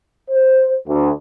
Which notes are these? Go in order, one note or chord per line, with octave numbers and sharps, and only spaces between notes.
C5
D2